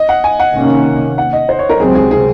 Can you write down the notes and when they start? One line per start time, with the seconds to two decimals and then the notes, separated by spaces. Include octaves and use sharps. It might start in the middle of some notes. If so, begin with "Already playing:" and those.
Already playing: D#5
0.09 F#5
0.24 G#5
0.40 F#5
0.55 C3 D#3 A#3 C#4
1.18 F#5
1.33 D#5
1.49 C5
1.59 C#5
1.69 A#4
1.80 C#2 C3 F#3 C4 G#4
1.95 G#4
2.11 G#4